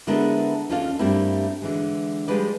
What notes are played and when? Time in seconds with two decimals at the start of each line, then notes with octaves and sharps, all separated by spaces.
0.07 D3 G#3 B3 E4 A4 A#4
0.70 D#2 C#4 F4 A4 D5 F5
0.99 G2 G3 A3 A#3 C4 E4
1.62 D3 E3 G#3
2.28 F3 G3 G#3 B4 D5